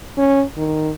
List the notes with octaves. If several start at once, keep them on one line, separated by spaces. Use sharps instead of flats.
C#4
D#3